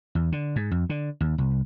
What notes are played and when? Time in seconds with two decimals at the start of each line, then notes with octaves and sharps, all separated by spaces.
0.15 E2
0.32 D3
0.56 G#2
0.71 F2
0.90 D3
1.21 D#2
1.38 C2